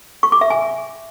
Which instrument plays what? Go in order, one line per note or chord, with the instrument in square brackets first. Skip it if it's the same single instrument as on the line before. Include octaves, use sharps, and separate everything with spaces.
[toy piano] C#6
D6
E5
G#5